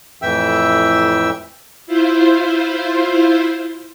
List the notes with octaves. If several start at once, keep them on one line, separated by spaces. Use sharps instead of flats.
F2 A2 E3 E5 G5 E6
E4 F4 C5